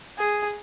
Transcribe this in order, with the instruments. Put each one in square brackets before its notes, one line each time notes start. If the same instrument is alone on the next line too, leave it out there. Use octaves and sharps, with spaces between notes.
[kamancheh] G#4